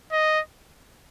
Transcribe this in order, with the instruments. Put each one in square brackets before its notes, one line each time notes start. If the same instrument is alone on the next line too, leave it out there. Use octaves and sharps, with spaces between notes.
[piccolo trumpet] D#5